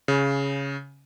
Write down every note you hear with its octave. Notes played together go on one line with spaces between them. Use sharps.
C#3